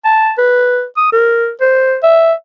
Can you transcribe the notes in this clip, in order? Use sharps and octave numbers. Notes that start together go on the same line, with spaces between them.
A5
B4
D#6
A#4
C5
E5